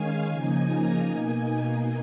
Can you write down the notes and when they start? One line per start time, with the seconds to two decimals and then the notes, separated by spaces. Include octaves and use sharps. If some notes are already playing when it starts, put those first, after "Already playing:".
Already playing: D#3 G#3 C#4 F5 G#5
0.31 C#3 F3 A#3 D#4 G#5
0.69 A#5
1.09 B2 A#3 D#4 G#5